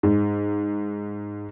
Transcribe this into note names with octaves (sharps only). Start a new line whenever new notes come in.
G#2